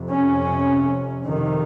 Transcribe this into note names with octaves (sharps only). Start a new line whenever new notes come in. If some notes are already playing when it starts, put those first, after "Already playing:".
Already playing: F2 C3
C#4
F2 C3 D#3